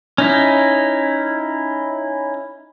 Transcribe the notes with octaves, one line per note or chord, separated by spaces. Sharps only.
C#4 D#4 E4